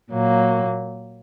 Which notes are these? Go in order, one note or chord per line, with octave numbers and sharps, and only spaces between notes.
A#2 F#3 A#3